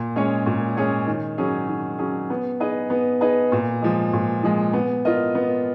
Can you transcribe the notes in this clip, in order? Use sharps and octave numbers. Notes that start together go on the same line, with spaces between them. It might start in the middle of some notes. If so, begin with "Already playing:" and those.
Already playing: A#2
G#3 C#4 G#4 C#5
A#2
G#3 C#4 G#4 C#5
D#3
F#3 C#4 G#4
D#3
F#3 C#4 G#4
B3
D#4 G#4 B4 D#5
B3
D#4 G#4 B4 D#5
A#2
F3 G#3
A#2
F3 G#3
B3
F4 A#4 D#5
B3